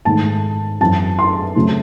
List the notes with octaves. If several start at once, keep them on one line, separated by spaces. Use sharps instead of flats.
G#2 D#3 A3 A5
F#2 E3 C4 A5
C6
C#3 F#3 A3 C4